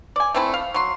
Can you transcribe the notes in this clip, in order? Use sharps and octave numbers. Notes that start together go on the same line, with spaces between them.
D5 G#5
A3 C4 E4
F5
F#3 C6